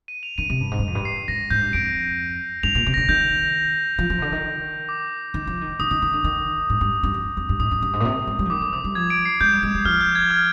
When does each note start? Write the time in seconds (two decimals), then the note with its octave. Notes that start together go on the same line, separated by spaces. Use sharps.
0.08 D#7
0.23 F7
0.38 D#3 D#7
0.50 C3
0.60 G2
0.71 G#2
0.79 G2
0.87 F2
0.95 G2
1.05 C7
1.28 G#2 A#6
1.50 G#2 G6
1.62 G2
1.73 F2 D7
2.63 G2 F7
2.75 A#2
2.87 C3
2.94 A#6
2.97 D3
3.09 D#3 G6
3.99 F3
4.10 F3
4.18 C3
4.22 D3
4.32 D#3
4.89 D6
5.34 D#3
5.47 F3
5.61 D#3
5.79 D#3 D#6
5.91 D#3
6.02 D#3
6.13 D3
6.24 D#3
6.70 G#2
6.81 G2
7.03 G2
7.14 F2
7.37 F2
7.49 G2
7.60 G#2 D#6
7.71 G2
7.82 G2
7.93 G#2
8.00 A#2
8.05 C3
8.27 G#3
8.39 G3
8.45 F3
8.50 D#3 D6
8.61 D3
8.73 C3 D#6
8.84 G3
8.95 F3 G#6
9.10 D7
9.25 C7
9.41 G#3 G6
9.52 G3
9.63 G#3 G6
9.75 G3
9.85 F3 F6
10.01 G6
10.15 G#6
10.30 F6